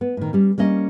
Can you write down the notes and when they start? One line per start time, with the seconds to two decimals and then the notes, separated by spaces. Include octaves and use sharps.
0.01 B3
0.17 A2 D#3
0.33 G3 C#4
0.58 G3 A#3 C#4 D#5